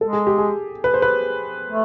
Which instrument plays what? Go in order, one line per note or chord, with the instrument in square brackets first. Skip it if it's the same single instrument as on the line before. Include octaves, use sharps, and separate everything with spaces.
[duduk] G#3 [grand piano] A4
[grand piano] G#4
G4
G#4
B4
C5
B4
[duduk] A3